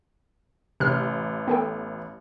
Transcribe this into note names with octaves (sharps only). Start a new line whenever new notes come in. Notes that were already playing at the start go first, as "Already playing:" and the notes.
A1 C3 F6
B3 A4 G5